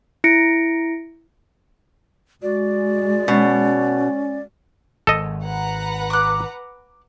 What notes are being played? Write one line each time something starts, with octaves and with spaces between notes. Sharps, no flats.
E4 A#6 C#7 D7
G#3 F#4 D5
B2 C#4
G#1 A4 D#5
B4 F#5 A#5
D6 F#6